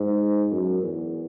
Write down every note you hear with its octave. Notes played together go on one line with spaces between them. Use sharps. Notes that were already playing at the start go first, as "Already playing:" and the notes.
Already playing: G#2
F#2
E2